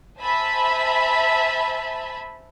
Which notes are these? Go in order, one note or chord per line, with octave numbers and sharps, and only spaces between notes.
C5 E5 G#5 A5 B5